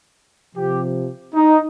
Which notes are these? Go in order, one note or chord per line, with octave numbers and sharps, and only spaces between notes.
C3 F3 G4
D#4